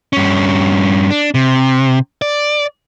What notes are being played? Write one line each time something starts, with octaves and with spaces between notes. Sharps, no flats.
G2 C#4
D4
C3
D5